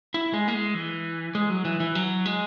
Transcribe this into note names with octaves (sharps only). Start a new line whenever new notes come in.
E4
G#3
A#3
G#3
E3
G#3
F#3
E3
E3
F#3
G#3